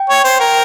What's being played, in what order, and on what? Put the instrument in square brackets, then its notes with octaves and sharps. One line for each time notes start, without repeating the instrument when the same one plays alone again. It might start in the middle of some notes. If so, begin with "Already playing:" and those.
Already playing: [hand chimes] G5
[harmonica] C#5
C5
[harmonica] A#4 [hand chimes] G5